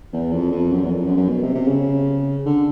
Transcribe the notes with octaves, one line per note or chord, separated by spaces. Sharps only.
E2
F2
F2
F#2
E2
F2
F#2
F#2
B2
C3
C3
C#3
D3